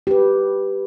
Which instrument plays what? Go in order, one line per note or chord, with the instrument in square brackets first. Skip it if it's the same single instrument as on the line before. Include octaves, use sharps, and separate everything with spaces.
[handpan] G4 B4